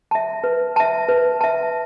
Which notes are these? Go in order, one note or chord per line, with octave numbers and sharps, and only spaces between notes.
E5 A5
B4
E5 A5
B4
E5 A5